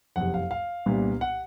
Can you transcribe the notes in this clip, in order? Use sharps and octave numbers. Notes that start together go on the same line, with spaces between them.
F#1 F2 C3 F#5
F5
F5
C2 A#2 G3 B3 D4
F#5